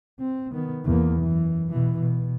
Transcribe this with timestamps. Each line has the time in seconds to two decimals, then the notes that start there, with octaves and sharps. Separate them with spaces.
0.20 C4
0.52 D#3 B3
0.85 E2 A#3
1.20 F#2 E3
1.70 B2 E3
1.99 B2